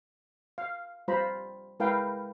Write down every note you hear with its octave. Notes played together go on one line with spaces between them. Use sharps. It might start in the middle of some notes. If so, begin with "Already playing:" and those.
F5
G3 F4 C5 A#5 B5
G#3 E4 A#4 B4 F5 G5